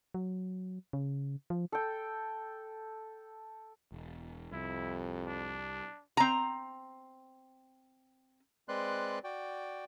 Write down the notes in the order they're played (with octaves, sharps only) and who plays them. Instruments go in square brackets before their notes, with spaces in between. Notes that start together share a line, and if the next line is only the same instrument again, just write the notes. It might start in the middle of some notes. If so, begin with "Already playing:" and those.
[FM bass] F#3
C#3
F3
[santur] A4 G5
[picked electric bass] E1
[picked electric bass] C2 [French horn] F2 [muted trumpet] E4
[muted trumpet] D4
[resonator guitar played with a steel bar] C4 A#5
[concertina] G#3 C4 B4 D5 C6 F#6
F#4 D5 G5